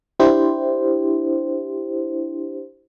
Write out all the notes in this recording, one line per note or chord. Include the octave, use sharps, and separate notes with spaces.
D4 E4 G4 C5